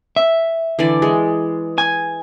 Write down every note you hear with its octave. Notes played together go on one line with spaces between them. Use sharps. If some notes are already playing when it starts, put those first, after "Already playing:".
E5
D3 E3 D5
G#3
G#5